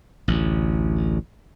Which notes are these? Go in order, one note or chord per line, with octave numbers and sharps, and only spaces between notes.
A1 D2